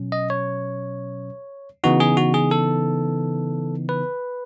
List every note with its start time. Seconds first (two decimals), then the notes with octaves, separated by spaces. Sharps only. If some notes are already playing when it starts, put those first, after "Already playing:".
Already playing: B2 F#3 C#4
0.12 D#5
0.30 C#5
1.84 C#3 E3 B3 D#4 F#4
2.00 G#4
2.17 F#4
2.34 G#4
2.51 A4
3.89 B4